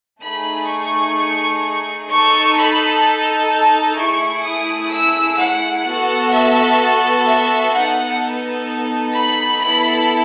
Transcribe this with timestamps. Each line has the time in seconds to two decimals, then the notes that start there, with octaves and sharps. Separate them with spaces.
0.21 A3 D#4 G#4 B5
0.69 C#6
2.09 D#4 A4 C#6
2.57 B5
3.50 A5
3.97 A3 E4 G#4 C#6
4.44 D#6
4.91 E6
5.39 F#5
5.86 B3 F#4 A4
6.32 E5
7.27 E5
7.73 B3 D#4 A4 F#5
9.15 B5
9.62 B3 E4 A4 B5